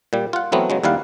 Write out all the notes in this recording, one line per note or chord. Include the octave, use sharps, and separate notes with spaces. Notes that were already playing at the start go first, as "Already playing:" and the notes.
A#2 G3
F4 F#5
E3 F#3 A3 B3 C4
C#3 F#3 G#3
D#2 G3 E4 F5 F#5